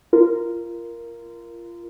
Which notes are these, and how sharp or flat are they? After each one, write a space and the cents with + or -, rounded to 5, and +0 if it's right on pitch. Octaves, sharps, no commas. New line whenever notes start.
F4 -25 A#4 +0